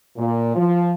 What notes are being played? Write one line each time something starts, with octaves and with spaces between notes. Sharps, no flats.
A#2
F3